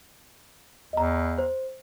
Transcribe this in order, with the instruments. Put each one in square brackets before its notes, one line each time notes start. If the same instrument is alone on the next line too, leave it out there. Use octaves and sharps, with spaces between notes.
[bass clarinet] E2 [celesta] D#5 A#5
[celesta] C5